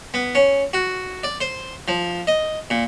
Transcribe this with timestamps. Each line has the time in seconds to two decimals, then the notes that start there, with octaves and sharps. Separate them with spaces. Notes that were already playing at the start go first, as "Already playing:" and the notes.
0.14 B3
0.35 C#4
0.73 F#4
1.24 D5
1.41 C5
1.88 F3
2.27 D#5
2.70 A#2